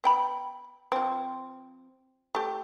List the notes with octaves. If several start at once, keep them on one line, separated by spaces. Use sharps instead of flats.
B3 G5 B5
F3 C4
A3 G4